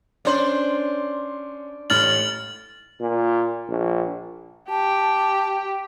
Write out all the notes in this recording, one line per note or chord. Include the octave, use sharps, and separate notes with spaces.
C#4 D4 C5 C6 F#7
A1 A2 F6 A6 F#7
A#2
A#1
G4 A5